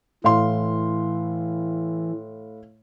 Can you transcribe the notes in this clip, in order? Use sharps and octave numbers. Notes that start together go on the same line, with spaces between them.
A2 E3 F5 C6